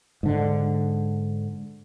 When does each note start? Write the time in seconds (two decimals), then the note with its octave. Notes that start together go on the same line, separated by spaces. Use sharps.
0.23 G#2 D3